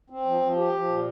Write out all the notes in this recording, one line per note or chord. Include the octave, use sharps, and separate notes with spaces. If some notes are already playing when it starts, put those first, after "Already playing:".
C4
F3
F3
G4
F3
A#2